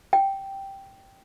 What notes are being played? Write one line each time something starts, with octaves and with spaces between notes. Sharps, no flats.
G5